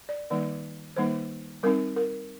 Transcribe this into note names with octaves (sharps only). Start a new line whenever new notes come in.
D5
D#3 G3 A#3 D#4 D5
D#3 G3 A#3 D#4 C5
G3 C4 D#4 A#4
A#4